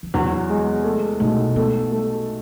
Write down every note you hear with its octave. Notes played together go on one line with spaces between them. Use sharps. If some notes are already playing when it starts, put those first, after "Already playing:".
E3
E2 F#3
G#3
A3
B1 A3
A3 B3
A3